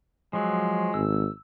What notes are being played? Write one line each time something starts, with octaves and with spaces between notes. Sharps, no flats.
F3 F#3 G#3
G#1 E6